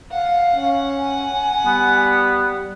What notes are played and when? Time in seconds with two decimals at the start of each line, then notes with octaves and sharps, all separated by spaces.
0.11 F5 F#5
0.56 C#4
0.99 G#5
1.66 G3 B3